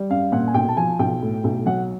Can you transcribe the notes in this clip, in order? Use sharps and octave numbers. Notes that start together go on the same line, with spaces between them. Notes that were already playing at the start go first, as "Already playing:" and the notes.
Already playing: G3
F#2 F5
A#2 F#5
G#5
B1 G5
A5
F3 G#5
B1 G5
A2
B1
F#3 F#5